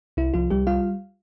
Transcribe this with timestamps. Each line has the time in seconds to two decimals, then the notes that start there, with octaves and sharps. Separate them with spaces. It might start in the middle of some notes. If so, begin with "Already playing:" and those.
0.17 C2 E4
0.34 C2 F3 F4
0.50 C2 G3 G4
0.67 G3 F4 F5